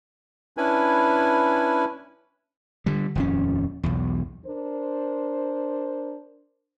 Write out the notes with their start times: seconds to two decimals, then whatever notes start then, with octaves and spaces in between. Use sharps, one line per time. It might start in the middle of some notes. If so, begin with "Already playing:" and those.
0.57 C#4 D4 E4 B4 G#5
2.86 D3 G3
3.15 D#1 F2 C#4
3.83 B1 E2
4.46 D4 A#4 C5